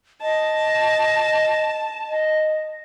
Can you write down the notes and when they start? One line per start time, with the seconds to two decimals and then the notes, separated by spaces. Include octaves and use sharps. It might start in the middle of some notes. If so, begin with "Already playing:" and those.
0.22 D#5 A5
2.09 D#5